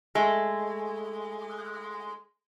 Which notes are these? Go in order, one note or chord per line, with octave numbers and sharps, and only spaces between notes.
G#3 A3